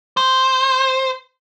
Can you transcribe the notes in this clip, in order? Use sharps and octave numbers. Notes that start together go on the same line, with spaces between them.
C5